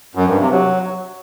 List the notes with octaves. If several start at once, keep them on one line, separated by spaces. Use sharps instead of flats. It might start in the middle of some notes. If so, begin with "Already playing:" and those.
F#2
G2
C3
F#3